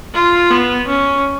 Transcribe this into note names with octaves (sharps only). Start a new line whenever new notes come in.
F4
B3
C#4